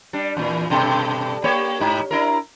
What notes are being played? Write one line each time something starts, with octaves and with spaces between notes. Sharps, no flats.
G3 D4
E2 A#2 E3
G2 B2 A4
A#3 G4 C#5
G#2 D#4
D4 E4 A#4